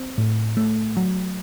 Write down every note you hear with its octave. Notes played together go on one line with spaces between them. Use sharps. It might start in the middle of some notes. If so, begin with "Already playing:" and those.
Already playing: C4
A2
A3
F#3